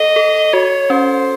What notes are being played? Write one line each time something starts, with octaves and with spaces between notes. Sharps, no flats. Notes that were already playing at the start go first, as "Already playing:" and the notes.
Already playing: A4 D#5
A4
F#4 C#5
C#4 C5